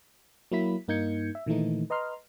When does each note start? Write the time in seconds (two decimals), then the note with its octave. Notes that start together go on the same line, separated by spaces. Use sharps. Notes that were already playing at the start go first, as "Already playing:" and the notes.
0.51 F#3 A#3 E4 B5 B6
0.88 G2 A#3 D#4 G6 G#6 C#7
1.35 E5
1.46 A#2 D#3 E3 A3 D#4
1.90 B4 D#5 A#5 C6 F6